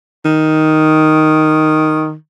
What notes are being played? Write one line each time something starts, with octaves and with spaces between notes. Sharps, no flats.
D#3